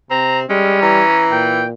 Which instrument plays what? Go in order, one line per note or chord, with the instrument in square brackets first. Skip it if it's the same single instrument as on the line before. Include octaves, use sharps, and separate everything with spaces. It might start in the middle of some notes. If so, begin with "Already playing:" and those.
[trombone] C3 [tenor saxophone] C4 [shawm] A#5
[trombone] G3 [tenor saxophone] G#3 [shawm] C#4
[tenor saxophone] E3 [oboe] A#5
[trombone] A#2 [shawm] G5